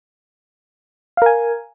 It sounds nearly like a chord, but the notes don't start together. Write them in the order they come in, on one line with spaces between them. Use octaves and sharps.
F5 A#4 G#5